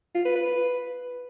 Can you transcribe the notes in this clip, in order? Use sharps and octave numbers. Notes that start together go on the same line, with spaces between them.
F4
B4
B4